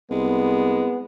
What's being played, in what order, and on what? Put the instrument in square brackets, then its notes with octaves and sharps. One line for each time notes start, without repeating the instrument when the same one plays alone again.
[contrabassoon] C2 [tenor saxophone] G#3 [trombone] B3